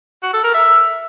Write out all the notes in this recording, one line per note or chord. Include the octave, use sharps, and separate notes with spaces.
F#4
A4
A#4
E5